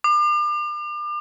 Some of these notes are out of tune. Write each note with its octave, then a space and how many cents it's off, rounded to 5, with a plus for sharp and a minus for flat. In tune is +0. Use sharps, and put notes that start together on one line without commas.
D6 +40